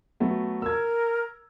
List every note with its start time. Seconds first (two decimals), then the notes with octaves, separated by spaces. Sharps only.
0.20 F#3 A3 B3
0.62 A#4 E6 G#6